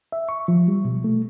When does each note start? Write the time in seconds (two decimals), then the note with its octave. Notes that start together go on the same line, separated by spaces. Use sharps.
0.12 E5
0.29 C#6
0.48 F3
0.68 G3
0.85 B2
1.04 A3